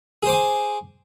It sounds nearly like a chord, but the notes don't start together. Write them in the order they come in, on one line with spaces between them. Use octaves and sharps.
G#4 C5 D6 G#5